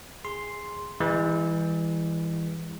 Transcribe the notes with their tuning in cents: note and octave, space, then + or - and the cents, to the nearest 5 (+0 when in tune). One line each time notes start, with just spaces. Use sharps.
G#4 -10 C6 +0
E3 +0 G#3 -45